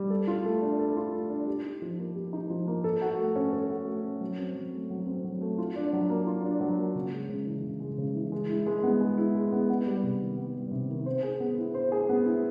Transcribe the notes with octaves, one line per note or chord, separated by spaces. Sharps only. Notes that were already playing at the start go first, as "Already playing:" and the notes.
Already playing: G3
A4
F4
A3
D4
A4
F4
A3
D4
G4
D#4
F3
A#3
G4
D#4
F3
A#3
A4
F#4
A3
C#4
A4
F#4
A3
C#4
F#3
C4
F#3
A3
F#3
C4
F#3
A3
F4
D4
F#3
A#3
F4
D4
F#3
A#3
C#3
G#3
C#3
E3
C#3
G#3
C#3
E3
G#3
E4
G#3
B3
G#3
E4
G#3
B3
B3
G3
C3
D#3
B3
G3
C3
D#3
C5
G#4
B3
E4
C5
G#4
B3
E4